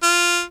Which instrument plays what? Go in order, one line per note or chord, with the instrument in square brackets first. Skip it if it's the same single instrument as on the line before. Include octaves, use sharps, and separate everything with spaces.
[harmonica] F4